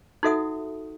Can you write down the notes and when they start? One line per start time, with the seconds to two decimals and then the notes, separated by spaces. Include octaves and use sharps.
0.23 D#4 F#4 A4 E5 F#5 D#6